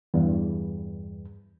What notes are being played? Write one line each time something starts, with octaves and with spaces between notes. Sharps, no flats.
E2 G2